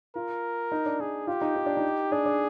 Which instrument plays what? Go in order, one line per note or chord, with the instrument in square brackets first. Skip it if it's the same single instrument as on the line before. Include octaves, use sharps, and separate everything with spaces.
[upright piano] F4 [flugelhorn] A#4
[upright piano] D#4
D4
[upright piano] D#4 [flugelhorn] G#4
[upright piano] F4 [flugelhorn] G4
[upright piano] D#4
D#4
D4
D#4
[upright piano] D4 [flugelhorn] G#4
[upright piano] D4